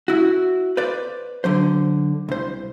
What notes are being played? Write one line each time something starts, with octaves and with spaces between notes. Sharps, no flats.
E4 F#4
B4 C5 D5
D3 F#3 C5
C2 C5